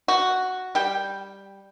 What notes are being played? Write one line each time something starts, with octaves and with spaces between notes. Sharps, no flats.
F#4
G3 G5